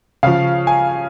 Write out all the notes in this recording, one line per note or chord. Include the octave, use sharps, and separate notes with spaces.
C#3 F3 F5
G#5